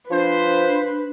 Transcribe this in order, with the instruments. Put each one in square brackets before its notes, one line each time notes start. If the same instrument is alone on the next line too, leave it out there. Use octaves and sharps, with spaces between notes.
[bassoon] F3 [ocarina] D4 [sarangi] B4 [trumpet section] C5